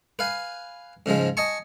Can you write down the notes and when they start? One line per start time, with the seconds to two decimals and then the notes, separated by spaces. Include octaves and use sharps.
0.19 B4 F5 G#5
1.06 G#2 C#3 F3 G#3
1.37 D#5 G#5 A5 C#6